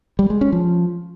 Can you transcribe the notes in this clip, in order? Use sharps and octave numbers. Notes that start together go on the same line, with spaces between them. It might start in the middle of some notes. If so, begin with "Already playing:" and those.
G3
G#3
C#4
F3